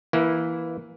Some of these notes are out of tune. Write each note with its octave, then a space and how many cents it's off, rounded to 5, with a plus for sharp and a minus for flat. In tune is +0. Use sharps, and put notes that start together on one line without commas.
E3 +0 A#3 +20 E4 +0